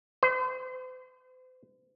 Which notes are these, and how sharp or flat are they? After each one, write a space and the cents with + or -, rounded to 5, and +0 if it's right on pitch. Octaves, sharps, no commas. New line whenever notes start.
C5 -40